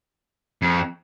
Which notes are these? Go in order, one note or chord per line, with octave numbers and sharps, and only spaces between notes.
F2